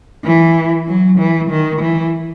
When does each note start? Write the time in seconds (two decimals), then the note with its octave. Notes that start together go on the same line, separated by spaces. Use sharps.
0.25 E3
0.88 F#3
1.19 E3
1.50 D#3
1.81 E3